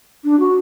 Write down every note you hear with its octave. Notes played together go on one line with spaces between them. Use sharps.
D4
F#4